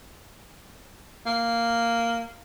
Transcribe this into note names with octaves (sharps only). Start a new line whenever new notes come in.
A#3